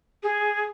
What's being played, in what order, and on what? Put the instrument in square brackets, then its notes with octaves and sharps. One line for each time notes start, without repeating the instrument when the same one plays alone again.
[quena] G#4